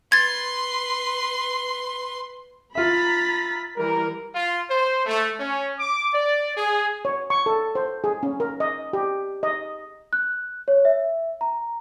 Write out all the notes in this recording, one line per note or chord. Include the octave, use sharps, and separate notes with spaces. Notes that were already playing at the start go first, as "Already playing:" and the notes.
B4 C6 G#6 A6
F4 E5 A#5 B5 A6 B6
E3 G3 A#4
F4
C5
A3
C#4
D6
D5
G#4
C#5
C#6
A4
C5
G#4
C#4
A#4
D#5
G4
D#5
F#6
C#5
E5
A#5